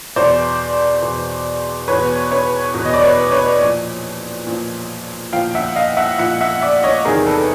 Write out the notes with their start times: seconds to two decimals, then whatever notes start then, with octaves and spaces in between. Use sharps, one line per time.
0.16 E2 B2 C5 D5
1.02 E2 B2
1.88 E2 B2 B4 C#5
2.31 B4 C#5
2.74 E2 B2
2.85 D#5
2.94 D5
3.04 B4 C#5
3.32 B4 C#5
3.61 A#2 F3
4.47 A#2 F3
5.33 A#2 F3 F5 G5
5.55 E5 F#5
5.76 D#5 F5
5.97 E5 F#5
6.18 A#2 F3 E5 F#5
6.41 E5 F#5
6.61 D5 E5
6.83 C#5 D#5
7.05 E2 C3 D#3 G#4 A#4
7.27 A4 B4